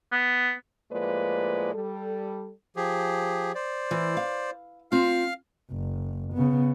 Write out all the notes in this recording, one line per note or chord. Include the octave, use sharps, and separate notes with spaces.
B3
A2 F3 G#3 A#3 B4 D5
G3 A4
F3 G4 G#4
C5 D5
E3
F5
C4 F4 F5 F6
F#1
C#3 B3